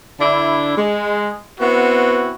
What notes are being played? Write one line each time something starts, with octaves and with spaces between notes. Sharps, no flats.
D3 D4 E4
G#3
B3 C4 E4 F#4